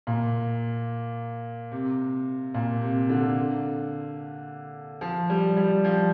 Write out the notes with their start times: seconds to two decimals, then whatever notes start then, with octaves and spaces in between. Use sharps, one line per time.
0.07 A#2
1.72 C3
2.54 A#2
2.82 C3
3.09 D3
5.01 F3
5.30 G3
5.57 G3
5.84 F3